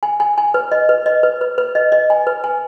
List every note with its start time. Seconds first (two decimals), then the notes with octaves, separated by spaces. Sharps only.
0.03 G#5
0.20 G#5
0.38 G#5
0.54 B4
0.72 D#5
0.89 B4
1.06 D#5
1.23 B4
1.41 B4
1.58 B4
1.75 D#5
1.92 D#5
2.10 G#5
2.27 B4
2.44 G#5